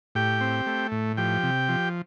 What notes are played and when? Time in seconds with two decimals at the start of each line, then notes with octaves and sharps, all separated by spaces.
0.15 A2 G4 G5
0.41 C4
0.66 A3
0.92 A2
1.17 F3 G4 G5
1.43 C3
1.69 F3